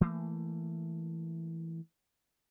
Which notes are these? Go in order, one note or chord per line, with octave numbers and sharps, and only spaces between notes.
E3 A3 A#3